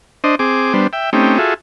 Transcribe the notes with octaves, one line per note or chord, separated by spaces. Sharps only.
D4 C5 D#5
C4 G#4 D6
G3 B3 D4 C5
E5 G5
A3 C4 C#4 D#4 G4
F4 F#4 G#4 A4 E5